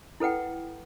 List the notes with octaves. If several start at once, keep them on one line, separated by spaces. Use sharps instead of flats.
E4 A4 B4 F#5 G5